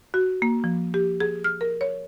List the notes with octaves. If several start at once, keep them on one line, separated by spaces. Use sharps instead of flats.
F#4
A#3
F3
G4
G#4
F6
A#4
C#5